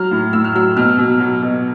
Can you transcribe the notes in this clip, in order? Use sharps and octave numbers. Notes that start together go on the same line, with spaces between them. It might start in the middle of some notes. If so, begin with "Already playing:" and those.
Already playing: F#3 F6
A2
A2 E6
F6
F#3 E6
B2 F6
B2
F#3
B2